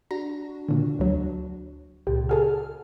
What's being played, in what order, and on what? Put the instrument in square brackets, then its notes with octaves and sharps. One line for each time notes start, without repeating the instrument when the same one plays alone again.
[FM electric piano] D4 F#4 [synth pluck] A#5
[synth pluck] A#2 D3
D2 F#3
[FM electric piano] C#2 A#2 [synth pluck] G4
[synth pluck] F#4 G#4 A4 [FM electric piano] F6